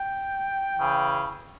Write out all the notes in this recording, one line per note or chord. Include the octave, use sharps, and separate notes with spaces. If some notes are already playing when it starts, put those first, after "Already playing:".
Already playing: G5
C#3 E3